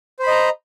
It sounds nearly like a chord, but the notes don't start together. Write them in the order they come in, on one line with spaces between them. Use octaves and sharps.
C5 B5 D#5 A#5